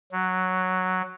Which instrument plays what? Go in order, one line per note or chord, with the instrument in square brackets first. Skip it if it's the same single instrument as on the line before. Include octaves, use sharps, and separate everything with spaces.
[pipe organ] F#3